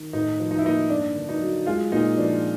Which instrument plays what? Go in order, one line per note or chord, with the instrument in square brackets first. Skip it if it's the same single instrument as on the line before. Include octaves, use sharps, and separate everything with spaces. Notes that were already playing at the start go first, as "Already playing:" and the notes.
Already playing: [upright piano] D#3
A2 D#4
F3
D#4
E4
A#3 D#4
G2 D4
D3
D#4
F#3
G#3 F4
A#2 D#4
F3 D4